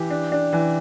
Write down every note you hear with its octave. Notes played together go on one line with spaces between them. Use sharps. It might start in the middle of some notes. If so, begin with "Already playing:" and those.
Already playing: E3 G4
D4
D4
E3